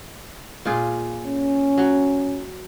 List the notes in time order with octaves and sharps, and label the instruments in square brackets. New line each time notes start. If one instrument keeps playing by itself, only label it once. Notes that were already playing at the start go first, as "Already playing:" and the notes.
[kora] A#2 F4 G#4
[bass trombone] C#4
[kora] F#3